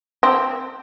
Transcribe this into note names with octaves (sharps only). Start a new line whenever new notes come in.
C4